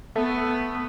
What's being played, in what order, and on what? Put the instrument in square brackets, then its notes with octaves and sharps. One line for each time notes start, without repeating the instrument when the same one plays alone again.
[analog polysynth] A3 [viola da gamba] B3